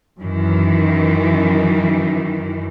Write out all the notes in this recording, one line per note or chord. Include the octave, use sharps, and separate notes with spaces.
F#2 D#3 E3